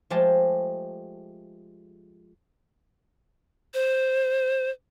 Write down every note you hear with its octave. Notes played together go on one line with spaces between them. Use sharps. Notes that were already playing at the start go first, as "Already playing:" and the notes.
F3 G#3 A3 G4 A5
C5